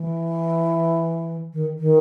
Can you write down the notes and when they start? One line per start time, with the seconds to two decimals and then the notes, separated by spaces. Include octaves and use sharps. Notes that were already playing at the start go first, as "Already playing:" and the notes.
Already playing: E3
1.53 D#3
1.79 D#3